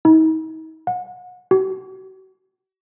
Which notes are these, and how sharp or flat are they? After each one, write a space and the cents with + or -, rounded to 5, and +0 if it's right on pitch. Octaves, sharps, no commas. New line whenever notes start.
D#4 +40
F#5 -35
F#4 +40